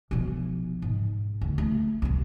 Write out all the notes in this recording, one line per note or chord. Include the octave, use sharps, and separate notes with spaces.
B1 F3
G#2
D2
A3
C2 G3